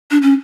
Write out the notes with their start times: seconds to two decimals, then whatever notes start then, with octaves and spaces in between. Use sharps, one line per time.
0.11 D4
0.22 C#4